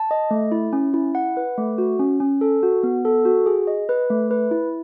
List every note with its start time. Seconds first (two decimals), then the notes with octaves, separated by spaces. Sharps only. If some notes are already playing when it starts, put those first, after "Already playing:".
Already playing: A5
0.11 D#5
0.31 A3
0.52 E4
0.73 C#4
0.94 E4
1.15 F#5
1.37 B4
1.58 A3
1.78 F#4
1.99 C#4
2.20 C#4
2.41 A4
2.63 F#4
2.83 B3
3.05 A4
3.25 F#4
3.46 G#4
3.67 D#5
3.89 B4
4.10 A3
4.31 B4
4.51 E4